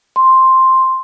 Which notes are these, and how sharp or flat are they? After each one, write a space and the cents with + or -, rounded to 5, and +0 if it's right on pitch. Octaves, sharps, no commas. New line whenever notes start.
C6 +5